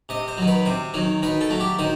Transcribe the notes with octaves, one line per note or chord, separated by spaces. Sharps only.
C3 D#5
C5
D#3 F#3
B4
C3 C5
D#3 F#3
D#3 B4
A4
F#3 A3
G4
D#3 C5